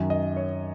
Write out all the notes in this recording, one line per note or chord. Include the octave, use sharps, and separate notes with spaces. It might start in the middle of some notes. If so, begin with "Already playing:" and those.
Already playing: F#2 D#3 F#3
D#5
C#5